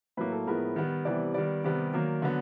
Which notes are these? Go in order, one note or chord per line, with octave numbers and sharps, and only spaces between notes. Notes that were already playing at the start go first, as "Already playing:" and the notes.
A2 F#3 A#3 B4
A4
A2 F3 G#3 B3 A#4
D#3 G3 B3
C3 E3 G3 B3 D5
D#3 G3 B3 D5
C3 D#3 G3 B3
D#3 F#3 A#3
D3 F#3 B3